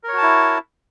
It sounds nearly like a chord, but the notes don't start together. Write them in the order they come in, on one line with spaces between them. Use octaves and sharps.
A#4 C#5 F#4 A5 E4